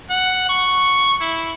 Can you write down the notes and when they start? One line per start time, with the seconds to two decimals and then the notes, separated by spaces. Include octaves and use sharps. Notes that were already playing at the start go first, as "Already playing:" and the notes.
0.10 F#5
0.49 C#6
1.21 E4